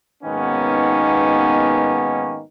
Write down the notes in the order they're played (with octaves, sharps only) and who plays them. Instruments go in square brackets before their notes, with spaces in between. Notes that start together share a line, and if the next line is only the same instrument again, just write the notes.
[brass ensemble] G#2 B2 D#3 A#3 B3 C#4